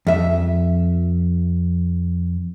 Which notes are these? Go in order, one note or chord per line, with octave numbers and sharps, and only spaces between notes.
F2 E5